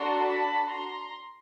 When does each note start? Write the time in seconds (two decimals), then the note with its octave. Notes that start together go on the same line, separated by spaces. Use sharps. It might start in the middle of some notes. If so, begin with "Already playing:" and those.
Already playing: D4 F#4 A4 A#5 C6
0.27 A5 B5
0.70 A#5 C6